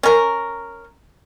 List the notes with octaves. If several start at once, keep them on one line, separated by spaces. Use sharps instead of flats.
C#4 A#4